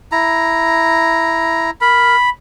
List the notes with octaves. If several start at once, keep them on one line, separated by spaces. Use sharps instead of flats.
E4 A#5
A#4 B5